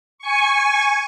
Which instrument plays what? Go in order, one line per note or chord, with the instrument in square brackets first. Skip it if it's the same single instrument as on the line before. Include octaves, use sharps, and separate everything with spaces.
[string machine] G#5 C#6